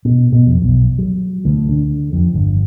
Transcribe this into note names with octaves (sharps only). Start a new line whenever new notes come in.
B2
B2
F2
B1
F#3
D2
D3
F2
G1